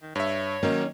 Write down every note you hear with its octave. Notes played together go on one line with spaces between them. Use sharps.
D#3
G2 C#5 E5
D#3 F#3 A#3 C#4 D#4